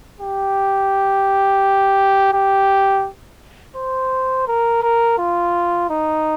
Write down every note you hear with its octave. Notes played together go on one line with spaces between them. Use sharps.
G4
G4
C5
A#4
A#4
F4
D#4